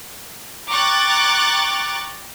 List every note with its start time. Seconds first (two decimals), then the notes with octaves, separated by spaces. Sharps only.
0.69 G5 A#5 C#6 D6 F#6 A6